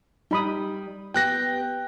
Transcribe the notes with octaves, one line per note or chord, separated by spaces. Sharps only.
G3 D#4 B5 D#6
B3 G4 G5 F#6 A#6